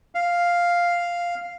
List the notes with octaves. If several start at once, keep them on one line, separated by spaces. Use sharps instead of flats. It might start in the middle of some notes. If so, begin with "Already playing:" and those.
F5